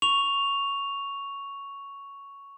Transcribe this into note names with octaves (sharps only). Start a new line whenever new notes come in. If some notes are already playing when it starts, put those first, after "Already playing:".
C#6 F7